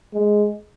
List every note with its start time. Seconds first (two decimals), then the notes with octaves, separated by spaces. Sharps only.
0.14 G#3